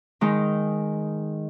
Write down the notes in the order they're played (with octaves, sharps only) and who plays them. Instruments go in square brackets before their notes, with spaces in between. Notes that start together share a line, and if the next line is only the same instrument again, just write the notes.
[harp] D#3 G#3 D#4